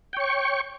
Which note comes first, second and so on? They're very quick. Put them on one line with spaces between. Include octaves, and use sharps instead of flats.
G5 C#5 C#6